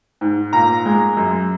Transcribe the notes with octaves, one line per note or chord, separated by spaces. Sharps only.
G#2
A#2 A#5
G#3
F#2